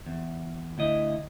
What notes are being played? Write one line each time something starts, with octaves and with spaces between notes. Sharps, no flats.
E2
D2 E4 D#5